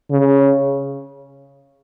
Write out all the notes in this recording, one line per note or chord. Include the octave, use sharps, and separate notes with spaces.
C#3